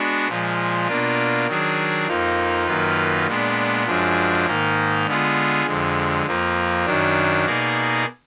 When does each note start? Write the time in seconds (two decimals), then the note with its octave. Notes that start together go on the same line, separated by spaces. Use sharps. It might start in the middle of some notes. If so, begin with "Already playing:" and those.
Already playing: G#3 B3 D4 F#4
0.28 A#2 F3 G#3
0.87 B2 A#3 D4 F4
1.47 D#3 F#3 D4 G#4
2.07 F2 F3 A#3 D#4
2.67 F#2 D#3 A#3 F4 B4
3.27 A#2 G#3 B3 D4
3.86 F#2 F3 G#3 D4
4.46 G#2 D#3 A#3 D#4
5.06 D3 G#3 B3 F4 G#4
5.66 F2 D3 G#3
6.26 F2 F3 A#3
6.85 F#2 D#3 F#3 D4
7.46 B2 A#3 D#4 G#4 D5